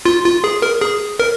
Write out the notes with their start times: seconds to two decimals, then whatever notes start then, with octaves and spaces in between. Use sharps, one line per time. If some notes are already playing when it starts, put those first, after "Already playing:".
0.05 F4
0.24 F4
0.44 G#4
0.62 A#4
0.81 G#4
1.20 A#4